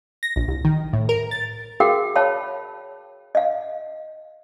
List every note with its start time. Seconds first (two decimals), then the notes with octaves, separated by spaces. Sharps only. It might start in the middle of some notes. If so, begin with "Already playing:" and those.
0.23 A#6
0.36 A#1
0.48 C2
0.65 D#3
0.93 A2
1.09 A#4
1.31 A6
1.80 F#4 G#4 A#4 F5 G5
2.16 C#5 F5 G5 A5 B5
3.35 D#5 F5